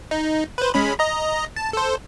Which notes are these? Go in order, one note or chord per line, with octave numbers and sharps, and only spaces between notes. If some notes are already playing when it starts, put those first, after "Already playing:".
D#4
B4 C5
G#3 C#4 B5
D#5 A#5
A5
A4 C5